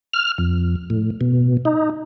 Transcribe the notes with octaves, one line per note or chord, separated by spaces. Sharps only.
F6
F2
A2
B2
D#4